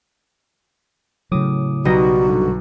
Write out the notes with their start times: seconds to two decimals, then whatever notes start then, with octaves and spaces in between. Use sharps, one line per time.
1.32 A2 C#3 F#3 D6 D#6
1.85 B1 G3 B3 D#4 F#4 A#6
2.29 C2 G2 D3